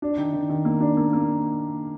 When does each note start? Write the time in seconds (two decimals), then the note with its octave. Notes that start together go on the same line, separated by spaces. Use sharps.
0.02 D4
0.18 D#3
0.33 D#3
0.49 D#3
0.65 A#3
0.81 D4
0.97 A#3
1.13 A#3